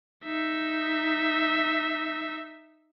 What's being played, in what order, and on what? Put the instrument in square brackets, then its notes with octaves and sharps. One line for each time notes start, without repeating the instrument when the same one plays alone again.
[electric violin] D#4 E5